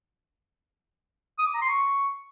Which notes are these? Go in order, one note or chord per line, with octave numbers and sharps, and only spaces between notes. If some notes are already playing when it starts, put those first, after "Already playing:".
D#6
D6
A#5
C6
C#6